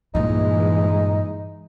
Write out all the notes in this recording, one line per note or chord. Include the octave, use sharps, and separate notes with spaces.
G2 A#2 E3 G#3 D#4